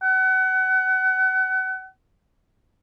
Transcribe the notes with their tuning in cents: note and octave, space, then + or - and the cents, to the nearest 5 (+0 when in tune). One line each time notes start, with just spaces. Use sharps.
F#5 +30